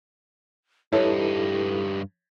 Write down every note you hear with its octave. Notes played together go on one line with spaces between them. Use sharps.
G2 D#4 E4 G4 A4 B4 C#5